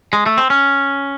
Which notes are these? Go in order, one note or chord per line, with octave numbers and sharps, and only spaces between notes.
G#3
A3
C4
C#4